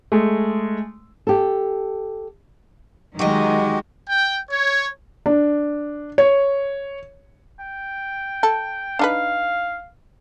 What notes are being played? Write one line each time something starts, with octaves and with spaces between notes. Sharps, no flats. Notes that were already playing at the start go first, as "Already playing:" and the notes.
G#3 A3
G4 A4
D#3 F#3 G#3 F#4 G4 D#5
G5
C#5
D4
C#5
G5
A4
D4 D#4 B4 F5